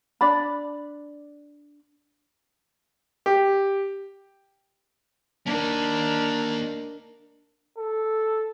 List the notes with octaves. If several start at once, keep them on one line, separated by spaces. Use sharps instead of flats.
D4 D5 B5
G4
A#3 D4 D#4 A#4
A4